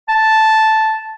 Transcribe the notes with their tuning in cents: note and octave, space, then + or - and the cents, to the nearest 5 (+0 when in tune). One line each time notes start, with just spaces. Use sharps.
A5 -5